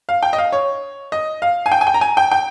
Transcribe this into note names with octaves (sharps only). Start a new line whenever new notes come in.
F5
G5
D#5
F5
C#5
D#5
F5
G#5
G5
G#5
G5
A#5
G#5
G5
G5